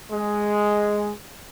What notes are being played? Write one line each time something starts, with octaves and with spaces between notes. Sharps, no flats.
G#3